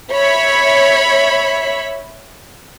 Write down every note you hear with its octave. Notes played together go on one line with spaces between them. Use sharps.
C#5 E5 B5